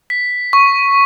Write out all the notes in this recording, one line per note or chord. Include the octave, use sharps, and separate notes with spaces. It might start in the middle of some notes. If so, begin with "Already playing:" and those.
B6
C#6